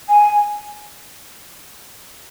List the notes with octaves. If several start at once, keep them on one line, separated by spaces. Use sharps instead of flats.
G#5